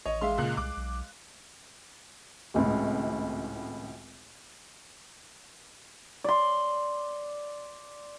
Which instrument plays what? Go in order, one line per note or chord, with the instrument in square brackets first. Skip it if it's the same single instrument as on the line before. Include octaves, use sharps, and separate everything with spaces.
[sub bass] A1 [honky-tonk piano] C#5 [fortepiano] D#5
[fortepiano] G#3 F5 [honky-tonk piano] E5 C6
[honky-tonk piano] C#2 A#2 F#6
[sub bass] C2 [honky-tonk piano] D6
[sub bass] B1
[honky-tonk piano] G#1 C#2 A2
[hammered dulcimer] D5 C6